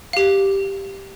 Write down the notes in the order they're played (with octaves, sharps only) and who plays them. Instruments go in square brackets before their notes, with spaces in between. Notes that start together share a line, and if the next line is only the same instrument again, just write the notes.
[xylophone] G4 F5